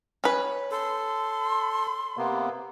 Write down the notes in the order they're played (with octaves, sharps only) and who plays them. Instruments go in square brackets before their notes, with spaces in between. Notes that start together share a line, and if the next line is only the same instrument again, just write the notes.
[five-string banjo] C#4 B4
[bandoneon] A4 [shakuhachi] C6
[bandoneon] C3 A#3 B3